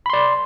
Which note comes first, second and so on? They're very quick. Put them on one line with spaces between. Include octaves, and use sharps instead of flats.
B5 C6 D5